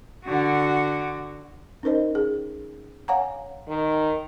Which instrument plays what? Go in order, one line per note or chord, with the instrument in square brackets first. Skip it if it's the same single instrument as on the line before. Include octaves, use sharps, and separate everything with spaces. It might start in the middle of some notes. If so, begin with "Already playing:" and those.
[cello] D3 F#4
[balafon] C#4 D#4 A#4 C5 D#5
G#4
C#5 F5 F#5 G#5 A#5
[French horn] D#3